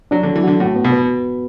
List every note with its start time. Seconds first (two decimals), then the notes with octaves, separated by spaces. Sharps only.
0.11 F#3 D4
0.23 D3 F#3
0.36 E3
0.44 D3 F#4
0.60 A2 F#4
0.76 B3
0.84 B2
0.92 B4